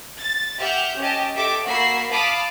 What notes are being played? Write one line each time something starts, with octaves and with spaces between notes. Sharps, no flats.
A6
G4 E5 F#5 F6 G6
C#4 G4 D#5 A5
G4 A4 D#5 E5 D6
A#3 F#4 B5 E6 C7
F5 A5 B5 D6 D#6